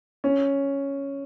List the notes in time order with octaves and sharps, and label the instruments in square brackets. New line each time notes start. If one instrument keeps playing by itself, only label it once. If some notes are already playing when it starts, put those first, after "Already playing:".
[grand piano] C#4